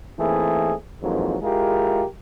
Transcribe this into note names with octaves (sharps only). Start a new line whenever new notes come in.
E3 A3 A#3 C4 D#4 G#4
F2 G#2 D#3 E3 F#3 A#3
G#3 E4 F4 G4 G#4 A#4